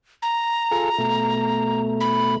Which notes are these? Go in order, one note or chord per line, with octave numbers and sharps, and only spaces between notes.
A#5
F4 G#4 A4
B2 A3
B5